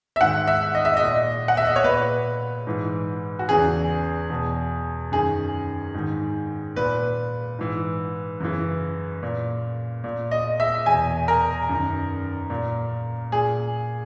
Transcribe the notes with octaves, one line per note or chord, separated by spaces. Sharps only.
E5
G#2 D#3 F#5
E5
D#5
E5
D#5
A#2
F#5
E5
D#5
C#5
A#2 B4
G#2 E3
F#4
E2 C#3 E3 G#4
E2 B2
F#2 D#3 G#4
G#2 D#3
A#2 B4
G#2 E3
F#2 C#3 E3
A#2
A#2
D#5
E5
E2 B2 G#5
A#4
F#2 D#3
A#2
A#2 G#4